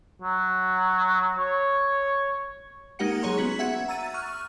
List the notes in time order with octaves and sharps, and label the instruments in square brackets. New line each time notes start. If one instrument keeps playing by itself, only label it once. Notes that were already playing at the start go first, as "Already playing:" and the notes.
[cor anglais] F#3
C#5
[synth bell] G#3 A#3 D#4 G4 F#5 C#7
F#3 G#4 C#5 A#5 C6
B3 C#4 F#4 B6
E5 F#5 G#6 C#7
A#5 E6 A6 D#7
C#6 F6 F#6 D#7